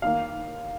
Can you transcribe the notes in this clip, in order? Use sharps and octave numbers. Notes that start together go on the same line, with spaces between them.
D#2 D#3 A#3 F5